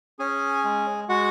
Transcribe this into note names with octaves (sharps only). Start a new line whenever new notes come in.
C#4 G#4 G#5
G#3
G#3 F#4 F#5